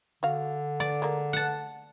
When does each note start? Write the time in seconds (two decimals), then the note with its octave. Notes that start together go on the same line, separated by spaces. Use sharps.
0.23 D3 F#4 F5
0.80 A3 D5
1.02 G#3 A#3
1.33 F#5 A5